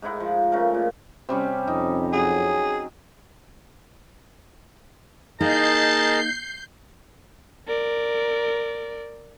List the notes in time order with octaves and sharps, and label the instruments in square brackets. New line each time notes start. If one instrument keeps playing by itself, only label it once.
[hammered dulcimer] G#2 D#4 E4 F#5
F3
C#3 A3 A#4
A#2
C3 G3 C#4
[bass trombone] F2 [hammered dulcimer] D#4
[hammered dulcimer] F#3 [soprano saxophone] G#4
[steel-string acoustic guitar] A#3 D#4 [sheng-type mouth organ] G#4 A#4 D#5 [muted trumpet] A5 [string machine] G6 C7
[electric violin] A#4 D5